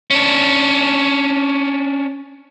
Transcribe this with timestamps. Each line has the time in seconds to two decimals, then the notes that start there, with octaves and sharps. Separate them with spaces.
0.10 C#4 D4